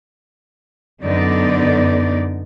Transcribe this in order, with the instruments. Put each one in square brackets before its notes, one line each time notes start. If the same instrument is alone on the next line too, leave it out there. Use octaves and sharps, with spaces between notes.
[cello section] F#2 D3 B3 D#4 D5